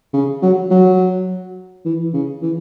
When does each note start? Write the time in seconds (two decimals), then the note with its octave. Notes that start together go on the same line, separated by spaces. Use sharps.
0.14 C#3
0.42 F#3
0.71 F#3
1.85 E3
2.13 C#3
2.42 E3